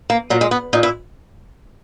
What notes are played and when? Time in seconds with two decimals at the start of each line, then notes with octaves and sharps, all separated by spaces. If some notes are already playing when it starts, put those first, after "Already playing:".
0.10 A#3
0.30 A#2 F#3
0.41 G#3
0.51 B3
0.73 A#2 D#4
0.83 E4